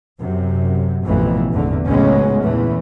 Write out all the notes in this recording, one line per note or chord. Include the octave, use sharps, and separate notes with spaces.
F#2 C3
A1 F2 B2 E3
G#1 E2 A2 D3 A3
C#2 A2 F#3 G#3 B3 C#4
E2 A#2 E3 A3